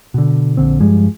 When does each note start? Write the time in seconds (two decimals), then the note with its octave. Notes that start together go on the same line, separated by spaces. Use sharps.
0.14 B2 D3
0.57 A#1 D3 C4
0.80 G2 F3 G3 G#3